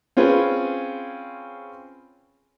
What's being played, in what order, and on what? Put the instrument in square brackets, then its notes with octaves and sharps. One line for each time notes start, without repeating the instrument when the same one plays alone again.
[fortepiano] C4 C#4 F4 G#4 B4